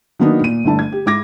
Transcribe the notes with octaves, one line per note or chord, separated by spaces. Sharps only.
D#3 F#3 A#3 B3 D4 D#4
A#2 D#7
G1 D3 A3 E4 A5
G#6
G4
G#2 E4 D6 G#6 A#6